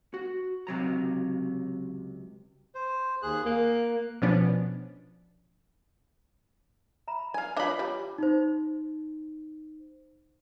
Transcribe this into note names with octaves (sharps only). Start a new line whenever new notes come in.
F#4
C#2 C3 F#3 A#5
C5
D#2 G#4 F#6
A#3 F#6
B2 F3 B3 C#4 D4
E5 A#5 B5
F5 G#5
E3 D4 F4 C#5 D#5 F5 B5
G3
D#4 C5